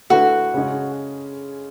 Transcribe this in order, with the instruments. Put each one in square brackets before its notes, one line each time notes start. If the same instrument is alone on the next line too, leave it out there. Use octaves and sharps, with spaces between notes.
[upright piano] D3 A3 E4 B4 [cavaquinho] F#4
[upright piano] C#3 G#3 C#4 G#4